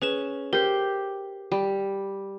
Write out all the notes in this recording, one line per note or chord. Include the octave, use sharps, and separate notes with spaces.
C#4 G#4 B4 E7
G4 A#4 C5
G3